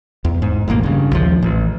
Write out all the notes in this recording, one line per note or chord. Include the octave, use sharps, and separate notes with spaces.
E2
G#2
E1 A1 G#3 A#3
G2 C#3
A#1 D#2 F3
A1